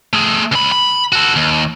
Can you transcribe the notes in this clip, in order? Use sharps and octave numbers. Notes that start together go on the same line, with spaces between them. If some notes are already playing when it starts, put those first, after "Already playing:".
A3 G#4
C#2 B5
B5
F#4 A4
D#2